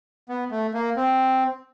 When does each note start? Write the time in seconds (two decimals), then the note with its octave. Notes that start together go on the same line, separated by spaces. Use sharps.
0.29 B3
0.51 A3
0.74 A#3
0.96 C4